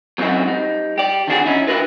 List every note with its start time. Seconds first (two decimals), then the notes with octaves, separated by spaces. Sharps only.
0.18 F#3 C4 C#4 D#4 E4 F#4
0.47 G3 D#4
0.98 G4 D5
1.27 D3 D#3 C4 D4 F#4 G#4
1.46 C#4 D#4 E4
1.67 D4 E4 F#4 A#4 B4